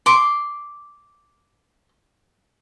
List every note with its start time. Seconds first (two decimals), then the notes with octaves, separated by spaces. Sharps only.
0.06 C6 D6